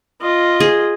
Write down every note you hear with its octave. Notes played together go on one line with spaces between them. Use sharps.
F4 D#5
G#4